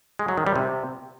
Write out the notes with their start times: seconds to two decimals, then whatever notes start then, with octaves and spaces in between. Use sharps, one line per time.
0.19 G#3
0.28 F#3
0.37 D#3
0.47 G3
0.56 C3